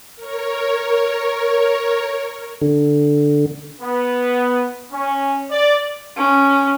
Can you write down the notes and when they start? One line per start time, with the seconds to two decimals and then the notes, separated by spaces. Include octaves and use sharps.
0.16 A#4 C#5
2.61 D3
3.80 B3
4.92 C#4
5.52 D5
6.16 C#4